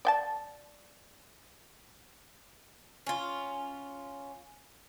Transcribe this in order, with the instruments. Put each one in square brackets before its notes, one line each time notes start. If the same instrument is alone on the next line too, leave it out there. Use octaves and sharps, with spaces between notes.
[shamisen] D5 G5 A5
[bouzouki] C#4 F4